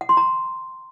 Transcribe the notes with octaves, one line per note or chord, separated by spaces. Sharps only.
F#5
C6
A#5